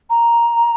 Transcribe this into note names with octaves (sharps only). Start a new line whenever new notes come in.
A#5